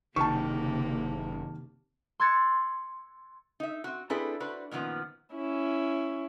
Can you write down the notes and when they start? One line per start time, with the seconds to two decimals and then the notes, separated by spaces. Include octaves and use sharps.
0.16 F#1 C3 D#3 A#3 A5 C#6
2.20 C6 E6 F#6 G#6 A6 C#7
3.60 D#4 E5
3.84 C4 F#4
4.10 C4 D4 E4 G#4 A4 B4
4.40 D4 F#4 B4 C5
4.71 F#2 A#2 D#3 F3 B3
5.35 C#4 E4